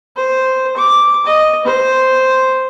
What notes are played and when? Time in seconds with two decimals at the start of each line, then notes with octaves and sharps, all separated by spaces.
0.17 C5
0.77 D6
1.26 D#5
1.65 C5